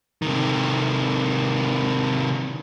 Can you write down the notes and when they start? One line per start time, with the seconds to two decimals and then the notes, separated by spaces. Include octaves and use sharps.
0.22 C3 D#3